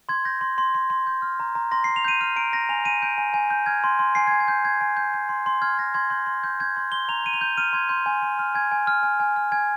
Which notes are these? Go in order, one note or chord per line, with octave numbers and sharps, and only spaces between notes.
C6 G#6
G6 A#6
C6
C6
C6
C6
G6
F6
A#5
A#5
C6 A#6
C7
C6
F7
G6 D#7
F6 D#7
A#5 D7
A#5 A#6
G#5 F7
G#5 D#7
G6 D7
G#5
G#5
G6
F6 G#6
C6
C6
G#5 C7
G#6
G#5
G#6
G6
G#5 G#6
G#5
G6
G6
C6
C6
F6 G#6
C6 A#6
C6 G#6
C6 G6
C6
G6
G6 G#6
C6
C6 G7
A#5 F7
A#5 D#7
F7
G6
F6 D#7
C6 G#6
C6 G6
G#5
G#5
F6
G#5 G#6
G#5
F6
G#5
G#5
F6
G#5 G#6